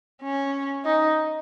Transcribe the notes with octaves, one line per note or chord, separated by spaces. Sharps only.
C#4
D#4